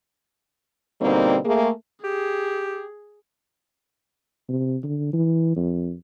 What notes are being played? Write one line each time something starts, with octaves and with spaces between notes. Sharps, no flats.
B2 D3 G3 A#3 C4 D#4
A3 A#3 G#4
G4 G#4
C3
D3
E3
F2